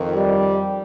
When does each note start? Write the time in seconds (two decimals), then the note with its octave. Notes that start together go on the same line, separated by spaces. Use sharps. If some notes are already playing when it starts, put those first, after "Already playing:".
Already playing: F2 D#3
0.15 G3